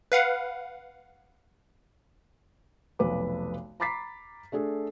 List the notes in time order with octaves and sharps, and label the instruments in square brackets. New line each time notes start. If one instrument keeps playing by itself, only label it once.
[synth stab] B4 F5 F#5
[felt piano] F1 B1 B4 D6
A#5 B5 D6 A6 B6 C7
A3 D4 G#4 A4